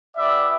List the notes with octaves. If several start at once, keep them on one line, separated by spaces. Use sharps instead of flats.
B3 E4 G4 D5 E5